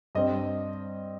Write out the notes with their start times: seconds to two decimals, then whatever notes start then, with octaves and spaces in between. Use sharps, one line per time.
0.15 G2 G3 C4 D#5